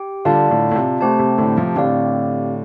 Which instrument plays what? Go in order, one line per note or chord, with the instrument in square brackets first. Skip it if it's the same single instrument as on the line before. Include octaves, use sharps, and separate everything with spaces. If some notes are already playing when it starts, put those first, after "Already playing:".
Already playing: [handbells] G4 G5
[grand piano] D3 G3 [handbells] F4 D5 F5 A5
[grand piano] A2 D3
A2
C3
[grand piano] C3 [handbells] A3 C4 G4 C5 A5
[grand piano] C3
A2 D3
C3 F3
[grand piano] A2 D3 [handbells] C4 G4 D5 F5